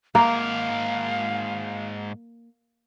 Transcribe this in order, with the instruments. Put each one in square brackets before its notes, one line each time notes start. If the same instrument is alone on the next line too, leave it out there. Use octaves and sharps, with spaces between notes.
[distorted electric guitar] G#2 A#4 [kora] A#3 [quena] F5 [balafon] A#5